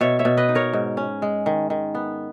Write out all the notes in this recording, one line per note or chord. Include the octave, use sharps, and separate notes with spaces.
B2 C#5 E5
C#5 E5
B2
B4 D#5
D#4
A#4 C#5
G#2
C#4
G#3
D#3
D#3
B3